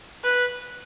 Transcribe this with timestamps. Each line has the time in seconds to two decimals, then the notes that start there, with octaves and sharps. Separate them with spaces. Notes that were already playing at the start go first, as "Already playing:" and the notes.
0.24 B4